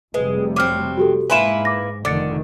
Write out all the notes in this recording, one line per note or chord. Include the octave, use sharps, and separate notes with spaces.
F1 C3 G3 G#3 B4
F#3 C4 D6 F6
F#4 G4 A4
G#2 A#3 E4 B4 G#5 C6 E7
D6 A#6
F1 D3 D#3 D6 A6 C#7